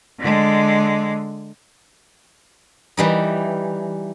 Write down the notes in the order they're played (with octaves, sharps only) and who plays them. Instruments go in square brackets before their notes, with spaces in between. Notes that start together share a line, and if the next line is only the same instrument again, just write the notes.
[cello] D3 G#3
[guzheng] E3 G3 D#4